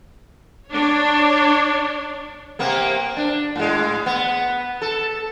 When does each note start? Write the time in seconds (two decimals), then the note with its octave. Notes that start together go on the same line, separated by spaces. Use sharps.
0.71 D4 C#5
2.59 C3 A#3 B3
3.17 D4
3.56 A2 G#3
4.06 B3
4.82 A4